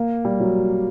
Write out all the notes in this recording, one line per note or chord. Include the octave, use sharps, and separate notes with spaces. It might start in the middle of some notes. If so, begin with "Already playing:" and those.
Already playing: A#3
G3
F#3